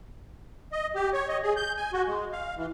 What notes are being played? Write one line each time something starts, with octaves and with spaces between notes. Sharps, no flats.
D#5
G4
C#5
D#5
G#4
G6
G#5
F#4
G#3
F5
E3